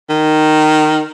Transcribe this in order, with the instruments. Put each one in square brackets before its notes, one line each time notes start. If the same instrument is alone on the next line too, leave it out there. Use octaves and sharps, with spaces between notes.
[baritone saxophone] D#3